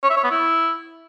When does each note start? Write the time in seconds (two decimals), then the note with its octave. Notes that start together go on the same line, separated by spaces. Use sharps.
0.03 C#5
0.10 E5
0.17 C#5
0.24 B3
0.31 E4